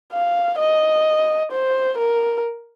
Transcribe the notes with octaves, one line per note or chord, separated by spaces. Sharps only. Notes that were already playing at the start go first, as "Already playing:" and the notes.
F5
D#5
C5
A#4